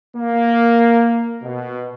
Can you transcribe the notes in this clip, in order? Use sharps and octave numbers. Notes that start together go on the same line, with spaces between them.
A#3
B2